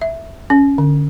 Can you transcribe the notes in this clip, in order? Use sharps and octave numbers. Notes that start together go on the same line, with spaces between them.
E5
C#4
D3